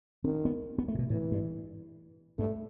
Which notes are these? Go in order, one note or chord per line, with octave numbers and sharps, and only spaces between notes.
D#3 C4
B3
B3
A3
A2
B2
A2 E3
G2
G2 A3